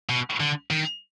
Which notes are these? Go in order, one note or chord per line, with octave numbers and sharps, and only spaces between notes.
B2
D3
D#3